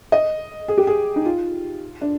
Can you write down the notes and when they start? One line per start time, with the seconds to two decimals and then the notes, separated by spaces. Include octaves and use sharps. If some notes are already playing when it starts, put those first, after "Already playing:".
0.12 D#5
0.68 G#4
0.77 G4
0.87 G#4
1.16 D#4
1.25 F4
2.01 D4